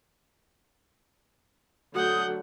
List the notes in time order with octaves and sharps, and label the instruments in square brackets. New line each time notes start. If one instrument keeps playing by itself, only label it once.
[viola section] D3 F#3 A3 [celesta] F#4 [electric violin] F#5 G6 [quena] D#6